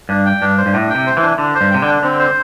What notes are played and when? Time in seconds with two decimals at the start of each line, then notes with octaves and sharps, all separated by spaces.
0.09 G2 D4
0.26 G5
0.42 G2 D4
0.58 C5
0.66 G2
0.74 A2 D4
0.90 C3 G5
1.07 C5
1.17 E3
1.22 D4
1.38 D3 D4
1.55 C5
1.61 G2
1.71 C3 G5
1.82 D3
1.87 D4
2.03 D3 C4
2.19 C5